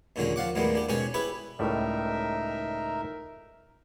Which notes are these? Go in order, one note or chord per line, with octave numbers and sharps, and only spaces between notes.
D#2 A#2 D3 F#3 G#3 C#4
F3 F5 F#5 D6
D#2 A2 G3 G#3 A#3 B3
D4 G4
G#2 B2 C#4 G4 C#5 G#5
E4 G4 G#4 B4 B5
C#2 A2 G3 D#4 A#4 E5